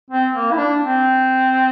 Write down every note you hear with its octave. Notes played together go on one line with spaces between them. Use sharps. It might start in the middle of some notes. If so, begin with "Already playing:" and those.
C4
A#3
E4
D4
C4